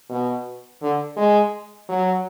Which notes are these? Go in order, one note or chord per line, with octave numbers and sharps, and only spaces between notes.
B2
D3
G#3
F#3